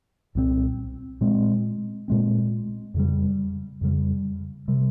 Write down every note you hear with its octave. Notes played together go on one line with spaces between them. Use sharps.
C2 A#2 G#3 C4
A#2 G#3 C4
A#2 G#3 C4
F2 C#3 G3
F2 C#3 G3
C3 G3